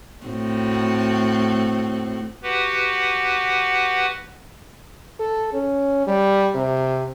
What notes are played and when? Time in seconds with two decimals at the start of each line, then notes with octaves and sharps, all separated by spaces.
0.26 A2 C4 F#4
2.43 F#4 G4 B4 F#5
5.20 A4
5.53 C#4
6.07 G3
6.55 C3